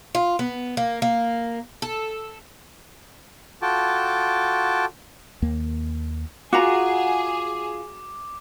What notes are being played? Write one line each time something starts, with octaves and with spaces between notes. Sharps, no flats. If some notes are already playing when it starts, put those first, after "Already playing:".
F4
B3
A#3
A#3
A4
F4 F#4 A4 G5 A5 D6
D#2 A#3
F4 F#4 G#4 F#5 A#5 D6